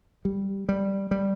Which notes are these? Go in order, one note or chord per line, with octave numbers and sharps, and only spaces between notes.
G3
G3
G3